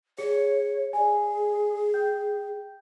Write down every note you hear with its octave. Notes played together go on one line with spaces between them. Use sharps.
G#4 C#5 C#7
G#4 D5 G#5
G5 G6